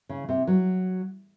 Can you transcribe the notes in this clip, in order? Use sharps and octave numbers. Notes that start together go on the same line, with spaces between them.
C#3
C3
F#3